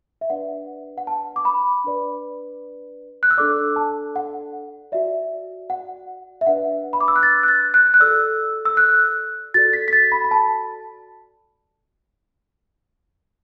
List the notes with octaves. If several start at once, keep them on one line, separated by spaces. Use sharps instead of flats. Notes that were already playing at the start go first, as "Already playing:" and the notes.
E5
D4 B4 D5 F#5
F#5
A5
D6
B5
D4 B4 D5
F#6
E6
D4 A4 D5 D6
A5
F#5
F#4 D5 E5
F#5
E5
D4 B4 D5 F#5
B5
D6
E6
F#6
A6
F#6
A6
F#6
F#6
F#4 A4 D5 E6
E6
F#6
F#4 A4 D5 A6
B6
B6
A6
B5
B5
A5